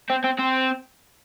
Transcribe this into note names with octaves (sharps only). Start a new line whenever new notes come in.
C4
C4
C4